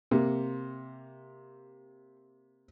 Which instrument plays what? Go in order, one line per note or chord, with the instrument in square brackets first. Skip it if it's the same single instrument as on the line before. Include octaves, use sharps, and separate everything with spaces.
[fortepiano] C3 A#3